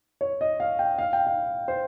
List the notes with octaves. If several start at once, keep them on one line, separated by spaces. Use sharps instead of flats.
C#5
D#5
F5
G5
F5
G5
F5
C5